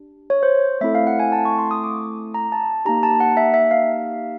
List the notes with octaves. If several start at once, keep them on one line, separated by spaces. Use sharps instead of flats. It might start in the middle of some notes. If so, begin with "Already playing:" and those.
Already playing: D4 G4
C#5
C5
A3 C4 E4 A4 E5
F5
F#5
G#5
A5
C#6
C6
D#6
D6
A#5
A5
A#3 D#4 G4 A#5
A5
F#5
E5
E5
F5